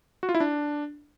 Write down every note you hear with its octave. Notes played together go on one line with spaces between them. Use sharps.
F#4
F4
E4
D4